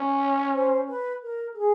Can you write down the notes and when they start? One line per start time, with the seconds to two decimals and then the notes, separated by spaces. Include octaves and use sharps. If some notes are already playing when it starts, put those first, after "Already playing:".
Already playing: C#4
0.19 C#5
0.54 C5
0.89 B4
1.23 A#4
1.54 A4
1.58 G#4